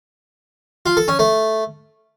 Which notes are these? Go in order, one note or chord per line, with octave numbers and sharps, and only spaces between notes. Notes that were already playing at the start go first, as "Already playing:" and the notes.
F4
A4
C#4
A3